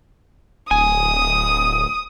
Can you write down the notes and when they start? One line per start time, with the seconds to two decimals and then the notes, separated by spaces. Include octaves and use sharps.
0.71 D1 G#5 D#6